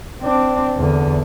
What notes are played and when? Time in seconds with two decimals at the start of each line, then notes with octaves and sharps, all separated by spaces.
0.22 C4 D4
0.77 E2 D3